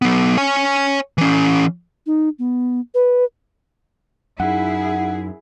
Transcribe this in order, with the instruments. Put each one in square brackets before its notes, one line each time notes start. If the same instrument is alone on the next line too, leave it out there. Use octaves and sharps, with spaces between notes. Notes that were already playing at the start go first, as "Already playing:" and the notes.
[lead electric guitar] F#3 B3
C#5 G#5
E3 C#4
[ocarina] D#4
B3
B4
[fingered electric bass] F#2 [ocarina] D#4 [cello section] E4 G#4 [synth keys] F#5